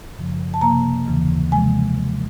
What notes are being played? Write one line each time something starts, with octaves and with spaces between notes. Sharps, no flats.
F#2 C#3 F3
A5
C3 F3 A#3 A#5
D#2 C#3 E3
C3 F3 G#3 G#5